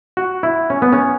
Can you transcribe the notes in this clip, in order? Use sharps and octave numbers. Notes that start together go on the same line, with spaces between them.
F#4
E4
C#4
B3
C#4